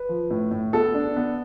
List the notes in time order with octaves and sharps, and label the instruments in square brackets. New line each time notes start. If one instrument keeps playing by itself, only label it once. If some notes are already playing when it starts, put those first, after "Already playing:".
Already playing: [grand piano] B4
F3
A2
A2
B3 A4
D4
B3